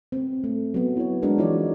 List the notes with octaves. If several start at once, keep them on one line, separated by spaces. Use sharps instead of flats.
C4
A3
F#3 B3
E4 C#5
G#3 D4 F#4 A#4
E3 F3 D#4 F4 C#5 D5